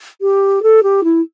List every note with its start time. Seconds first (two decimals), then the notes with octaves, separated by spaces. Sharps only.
0.21 G4
0.63 A4
0.83 G4
1.04 E4